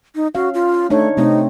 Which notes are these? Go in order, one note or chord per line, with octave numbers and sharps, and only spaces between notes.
D#4
C#4 F#4 F5
F4
A3 D4 D#4 C#5
C3 A3 C4 D#4